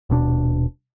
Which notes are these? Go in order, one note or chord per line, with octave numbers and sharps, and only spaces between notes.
D#1 B2 D4